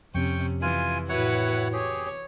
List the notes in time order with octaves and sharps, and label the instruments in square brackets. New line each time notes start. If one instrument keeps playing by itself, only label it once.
[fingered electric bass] F2 [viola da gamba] C3 C#4 [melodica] G5 C#6
[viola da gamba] E3 [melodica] F4 G#5
[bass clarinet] A2 [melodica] E4 C#5 F#5 [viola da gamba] F#4 B4
[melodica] G4 G#4 [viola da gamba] C#5